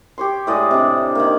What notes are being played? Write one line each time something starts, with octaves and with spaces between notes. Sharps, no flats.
G4 C#5 C6
A2 G#3 D5 D#5
C3 D4
D#3 A#3